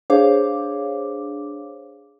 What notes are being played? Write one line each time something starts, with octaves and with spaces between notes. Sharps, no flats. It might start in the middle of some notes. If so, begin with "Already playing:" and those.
D4 G#4 C5 C#5 F5 D6